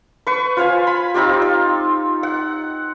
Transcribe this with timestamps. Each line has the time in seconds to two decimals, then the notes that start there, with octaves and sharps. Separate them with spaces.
0.27 B4 C#6
0.57 F4 C5 F5 G#5
0.87 B5
1.14 C4 D#4 F4 G4
1.42 D#4
2.23 F#5